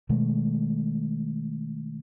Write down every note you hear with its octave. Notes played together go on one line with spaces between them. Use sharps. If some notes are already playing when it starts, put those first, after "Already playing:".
B2 D#3 G#3 A3